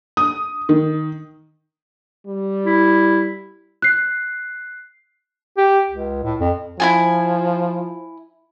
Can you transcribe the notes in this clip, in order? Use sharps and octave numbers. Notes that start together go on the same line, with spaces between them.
D#6
D#3
G3
E4
F#6 C7
G4
C#2
A2
F2
F3 E4 F4 G#5